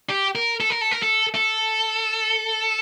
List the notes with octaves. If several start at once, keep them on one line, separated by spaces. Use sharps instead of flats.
G4
A#4
A4
A#4
A4
A#4
A4
A4